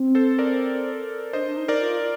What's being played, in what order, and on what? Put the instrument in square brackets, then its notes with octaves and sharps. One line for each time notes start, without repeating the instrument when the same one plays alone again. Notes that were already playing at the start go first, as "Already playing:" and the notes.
Already playing: [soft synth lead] C4
[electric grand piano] A4 C5
A#4 D5
[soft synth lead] D4 [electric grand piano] C5 D#5
[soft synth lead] D4
D#4
[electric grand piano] A#4 D5
[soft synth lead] F4